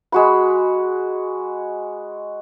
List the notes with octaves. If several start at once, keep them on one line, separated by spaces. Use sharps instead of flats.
G#3 F#4 B5